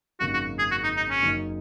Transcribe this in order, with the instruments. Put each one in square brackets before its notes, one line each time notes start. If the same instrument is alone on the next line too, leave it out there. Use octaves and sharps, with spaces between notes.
[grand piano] G#1 F#2 C#3 A#3 D#4 [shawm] F#4
[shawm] F#4
G#4
F#4
D#4
D#4
C#4
[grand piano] F#1 F#2 F#3 A#3 D#4